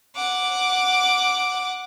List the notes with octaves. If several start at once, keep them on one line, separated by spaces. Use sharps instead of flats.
F#5 D6